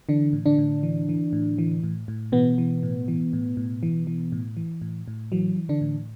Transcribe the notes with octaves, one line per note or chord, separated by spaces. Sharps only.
D3 E3 D4
A2
D3 D4
A2
E3
E3
A2
E3
A2
A2
B2 E3 B3
E3
A2
E3
A2
A2
E3
E3
A2
E3
A2
A2
E3 F#3
E3
D3 D4
A2